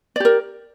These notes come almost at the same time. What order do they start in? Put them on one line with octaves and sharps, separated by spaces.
D5 G4 A#4